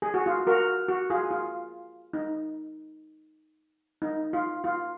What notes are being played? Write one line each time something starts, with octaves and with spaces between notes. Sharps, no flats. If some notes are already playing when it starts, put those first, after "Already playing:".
G#4
F#4
F4
F#4 A#4
F#4
F4 G#4
F4
D#4
D#4
F4
F4